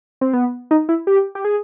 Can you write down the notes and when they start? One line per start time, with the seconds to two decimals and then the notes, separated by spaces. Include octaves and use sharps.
0.21 C4
0.33 B3
0.71 D#4
0.89 E4
1.07 G4
1.35 G4
1.45 G#4